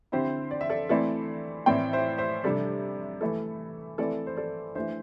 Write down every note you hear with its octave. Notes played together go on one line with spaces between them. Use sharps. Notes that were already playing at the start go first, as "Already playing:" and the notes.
D3 C4 E4 G4 C5
D5
E5
A4 D5
E3 A3 C4 E4 A4 D5
A2 E3 C4 E4 D5 G5
C5 E5
C5 E5
C3 G3 D4 A4 D5
E3 A3 E4 A4
E3 A3 C4 E4 A4 D5
C5
A4 D5
E3 A3 D4 C5 E5